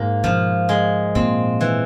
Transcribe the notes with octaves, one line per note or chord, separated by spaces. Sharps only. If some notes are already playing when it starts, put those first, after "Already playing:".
Already playing: G#2 A#3
B2 F3
G#3
A#2 C4
E3